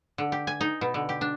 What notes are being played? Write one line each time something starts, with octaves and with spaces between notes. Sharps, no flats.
D3
G4
G#5
D#4
B2
D3
G4
D4